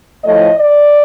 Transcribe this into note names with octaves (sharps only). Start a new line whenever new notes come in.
A2 F3 D#5
D5